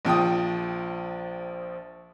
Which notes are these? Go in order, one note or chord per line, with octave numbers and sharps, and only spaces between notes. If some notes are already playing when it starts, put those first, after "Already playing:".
A#1 F3 G5 D#6